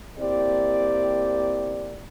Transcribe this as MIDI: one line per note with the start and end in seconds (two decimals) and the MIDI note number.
0.19 2.02 58
0.19 2.02 60
0.19 2.02 64
0.19 2.02 67
0.19 2.02 74